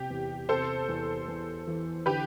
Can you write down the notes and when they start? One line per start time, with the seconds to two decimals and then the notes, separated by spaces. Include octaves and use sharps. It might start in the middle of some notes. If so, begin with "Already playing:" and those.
Already playing: C3 G4
0.10 E2
0.48 C3 A4 C5
0.88 E2
1.28 E2
1.67 E3
2.06 D3 G4 B4